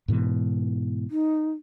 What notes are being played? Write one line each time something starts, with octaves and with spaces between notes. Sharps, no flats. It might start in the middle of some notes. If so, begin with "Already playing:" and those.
G#2 B2 E3
D#4